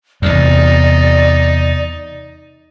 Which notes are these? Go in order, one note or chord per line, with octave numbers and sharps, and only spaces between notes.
E2 C3 D#4 D5